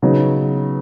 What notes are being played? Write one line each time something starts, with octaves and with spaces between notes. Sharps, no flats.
C#3 F#3 B3 D#4